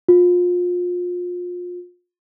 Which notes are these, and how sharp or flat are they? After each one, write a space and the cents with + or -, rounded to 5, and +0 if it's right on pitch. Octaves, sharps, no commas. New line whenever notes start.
F4 +30